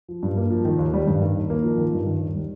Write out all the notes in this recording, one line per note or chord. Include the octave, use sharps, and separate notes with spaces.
F3
G2
A#3
F3
D#3
D#2
G3
G2
D#3
D#2
A#3
F3
D#3
G2
D#3
D#2
G3